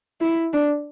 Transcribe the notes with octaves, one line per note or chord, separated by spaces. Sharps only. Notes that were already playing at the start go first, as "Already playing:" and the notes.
E4
D4